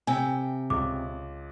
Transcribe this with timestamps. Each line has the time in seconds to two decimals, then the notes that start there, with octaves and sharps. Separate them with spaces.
0.07 C3 G5 G#5
0.70 C#2 D6